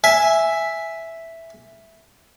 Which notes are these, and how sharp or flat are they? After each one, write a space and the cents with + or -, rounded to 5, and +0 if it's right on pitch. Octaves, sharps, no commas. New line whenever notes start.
E5 +0 G#5 -5